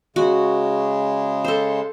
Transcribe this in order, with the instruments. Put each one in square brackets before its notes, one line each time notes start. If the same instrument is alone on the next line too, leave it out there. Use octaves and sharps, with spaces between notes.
[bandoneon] C#3 G#3 [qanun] F#4
[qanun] A4 C5